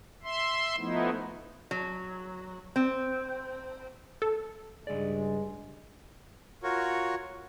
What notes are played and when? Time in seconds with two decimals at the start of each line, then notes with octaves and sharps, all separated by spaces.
0.23 E5 C6
0.78 F3 A3 B3 D#4 E4
1.71 F#3
2.76 C4
4.22 A4
4.87 C#2 G2 G#3 D5
6.63 F4 F#4 A#4 C#5